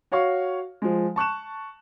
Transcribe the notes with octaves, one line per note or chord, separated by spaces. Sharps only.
F#4 C#5 F5 C#6
F3 G#3
A5 C#6 F#6 E7